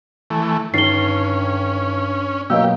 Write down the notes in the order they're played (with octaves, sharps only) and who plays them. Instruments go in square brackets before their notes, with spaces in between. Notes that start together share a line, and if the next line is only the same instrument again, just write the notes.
[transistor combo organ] E3 A3
[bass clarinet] G2 [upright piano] D3 D#3 A6 [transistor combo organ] C#4 [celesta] C7 G7
[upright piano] B2 F#3 A#3 [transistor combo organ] G4 [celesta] D#5 F5 E6